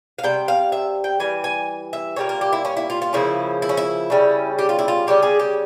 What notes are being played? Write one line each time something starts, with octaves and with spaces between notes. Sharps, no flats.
F5
C3 G3 G5
F5
E5
G5
E3 G3 G#5
G#5
E5
A#2 G3 A#3 C#5
A#4
G4
E4
C#4
E4
F4
F4
C#3 F3 A#3 C#4 E4
E4
C#4
E4
C#3 G3 C#4
G4
F4
E4
F4
C#3 G3 C#4 G4
G#4
G4